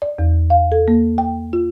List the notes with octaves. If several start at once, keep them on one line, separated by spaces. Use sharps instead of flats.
D5
E2
F5
A4
A#3
G5
F4